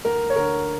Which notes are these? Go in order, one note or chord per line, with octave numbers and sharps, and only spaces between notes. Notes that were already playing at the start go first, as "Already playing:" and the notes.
D2 A#4
C#5
D3 A#4